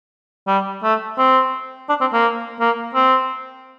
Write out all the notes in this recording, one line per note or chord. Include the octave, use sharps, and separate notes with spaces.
G3
A3
C4
D4
C4
A#3
A#3
C4